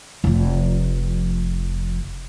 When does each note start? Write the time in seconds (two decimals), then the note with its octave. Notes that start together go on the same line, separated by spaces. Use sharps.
0.24 F1 F3